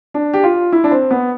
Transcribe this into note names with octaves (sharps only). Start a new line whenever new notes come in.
D4
G4
F4
E4
D4
C4
B3